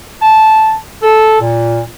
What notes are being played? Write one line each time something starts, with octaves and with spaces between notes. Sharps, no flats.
A5
A4
A#2